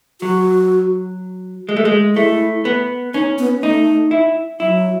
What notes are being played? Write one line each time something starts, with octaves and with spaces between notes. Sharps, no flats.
F#3 F#4
G#3
A3
G#3
A3 E4
B3
C#4 D#4
B3
A3 D#4
E4
F#3 E4